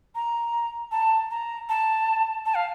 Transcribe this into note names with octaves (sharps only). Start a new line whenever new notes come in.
A#5
A5
A#5
A5
A5
F5